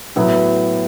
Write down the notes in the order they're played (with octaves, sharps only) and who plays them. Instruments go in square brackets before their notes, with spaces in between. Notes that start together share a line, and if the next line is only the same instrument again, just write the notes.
[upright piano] A2 F#3 B3